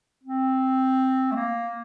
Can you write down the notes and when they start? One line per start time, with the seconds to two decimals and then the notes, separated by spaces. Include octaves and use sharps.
0.23 C4
1.32 A3
1.35 A#3